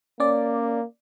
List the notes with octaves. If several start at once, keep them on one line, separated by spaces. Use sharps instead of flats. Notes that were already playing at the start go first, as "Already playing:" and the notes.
A#3 C#4 D5